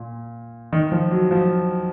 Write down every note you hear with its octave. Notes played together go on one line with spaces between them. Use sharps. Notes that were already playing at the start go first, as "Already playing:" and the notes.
Already playing: A#2
D#3
F3
F#3
F3